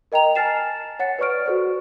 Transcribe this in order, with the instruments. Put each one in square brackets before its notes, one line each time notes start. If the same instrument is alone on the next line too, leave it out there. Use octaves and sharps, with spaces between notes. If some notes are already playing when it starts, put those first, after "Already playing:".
[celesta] A#4 D#5 G5 A#5 F7
G#5 A5 F6 A6 C7 E7
C#5 F#5 A6 C#7
B4 C#5 D5 C#6 F6 D7
F#4 A4 C5